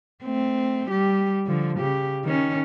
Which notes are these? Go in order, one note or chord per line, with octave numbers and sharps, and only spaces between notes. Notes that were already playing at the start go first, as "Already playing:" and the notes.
A3 C4
G3 G4
D3 F3
C#3 G4
D#3 C#4